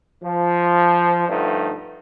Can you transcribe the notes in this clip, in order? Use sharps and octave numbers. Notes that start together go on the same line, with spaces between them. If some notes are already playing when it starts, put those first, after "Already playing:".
F3
G2 D3 F3 G3 A3 D#4